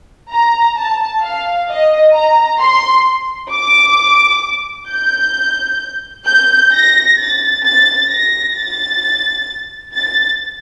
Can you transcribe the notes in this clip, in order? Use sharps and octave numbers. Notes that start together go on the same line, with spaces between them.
A#5
A5
F5
D#5
A#5
C6
D6
G6
G6
A#6
A6
A6
A#6
A6
A6